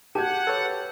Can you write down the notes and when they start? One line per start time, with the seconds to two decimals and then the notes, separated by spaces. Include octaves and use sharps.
0.15 G4 F#5 A5 G6 G#6
0.47 A4 B4 C#5